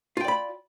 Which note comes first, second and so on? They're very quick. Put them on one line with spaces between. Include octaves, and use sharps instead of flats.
F4 G5 D5 B5